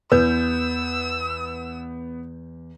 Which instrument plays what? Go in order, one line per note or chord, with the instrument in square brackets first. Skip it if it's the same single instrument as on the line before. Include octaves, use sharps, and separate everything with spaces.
[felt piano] E2 [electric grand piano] B3 G6 [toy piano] B4 [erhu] E6